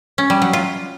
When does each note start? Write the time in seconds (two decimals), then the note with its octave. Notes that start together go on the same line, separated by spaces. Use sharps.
0.18 C#4
0.30 G3
0.42 F#3
0.53 F4